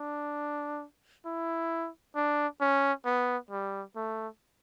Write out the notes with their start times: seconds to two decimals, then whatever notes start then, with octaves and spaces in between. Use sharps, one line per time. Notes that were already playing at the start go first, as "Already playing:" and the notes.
Already playing: D4
1.26 E4
2.16 D4
2.61 C#4
3.06 B3
3.51 G3
3.96 A3